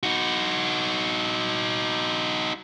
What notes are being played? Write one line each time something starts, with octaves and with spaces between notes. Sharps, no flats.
D#4 F#4